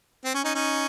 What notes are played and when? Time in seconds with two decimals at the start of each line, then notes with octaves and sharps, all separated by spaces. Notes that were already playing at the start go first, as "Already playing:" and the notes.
0.25 C4
0.34 C#4
0.45 C#4 D#4
0.55 C#4 D#4